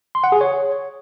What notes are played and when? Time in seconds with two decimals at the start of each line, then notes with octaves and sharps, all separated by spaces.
0.15 C6
0.24 F#5
0.32 G#4
0.41 C#5